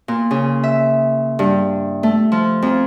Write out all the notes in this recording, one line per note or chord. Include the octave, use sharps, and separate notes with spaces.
A#2
C#3
E5
G2
A3
F3
F2